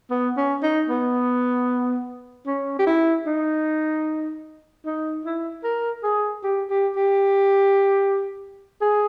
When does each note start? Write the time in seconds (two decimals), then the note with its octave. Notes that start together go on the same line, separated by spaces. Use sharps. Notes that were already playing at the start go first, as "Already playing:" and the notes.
0.11 B3
0.37 C#4
0.63 D#4
0.89 B3
2.47 C#4
2.79 G4
2.87 E4
3.26 D#4
4.85 D#4
5.25 E4
5.64 A#4
6.03 G#4
6.43 G4
6.70 G4
6.96 G4
8.81 G#4